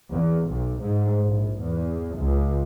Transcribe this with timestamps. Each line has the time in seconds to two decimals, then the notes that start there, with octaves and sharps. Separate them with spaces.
0.12 E2
0.48 B1
0.80 G#2
1.23 A#1
1.60 E2
2.16 C#2